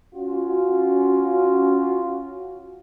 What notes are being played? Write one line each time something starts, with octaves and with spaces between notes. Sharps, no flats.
C#4 F4 F#4